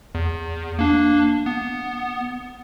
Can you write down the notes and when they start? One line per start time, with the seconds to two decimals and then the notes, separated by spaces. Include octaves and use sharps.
0.15 E2
0.79 A#3 D4
1.46 B3